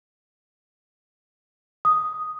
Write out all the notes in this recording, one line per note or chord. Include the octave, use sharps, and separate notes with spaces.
D#6